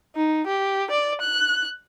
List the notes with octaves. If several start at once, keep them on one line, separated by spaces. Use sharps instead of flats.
D#4
G4
D5
F#6